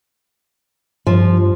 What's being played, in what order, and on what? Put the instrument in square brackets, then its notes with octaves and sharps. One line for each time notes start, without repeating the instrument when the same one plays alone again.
[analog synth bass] G2 [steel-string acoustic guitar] F3